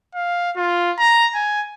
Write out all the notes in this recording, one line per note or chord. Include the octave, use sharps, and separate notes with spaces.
F5
F4
A#5
G#5